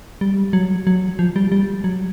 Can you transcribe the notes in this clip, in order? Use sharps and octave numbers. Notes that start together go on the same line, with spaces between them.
G3
F#3
F#3
F3
G3
G3
F#3